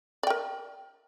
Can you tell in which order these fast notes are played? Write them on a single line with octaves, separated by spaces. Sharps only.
D5 G5 A#4